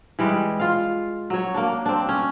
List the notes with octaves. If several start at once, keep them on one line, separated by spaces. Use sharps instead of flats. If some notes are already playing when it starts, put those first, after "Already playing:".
E3 G3 G#3
F4 F5
F#3 C#5
A#3 D4
C4 D4
C#4